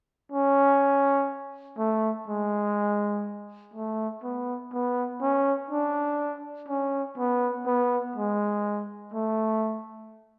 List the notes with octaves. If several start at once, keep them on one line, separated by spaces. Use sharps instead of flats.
C#4
A3
G#3
A3
B3
B3
C#4
D4
C#4
B3
B3
G#3
A3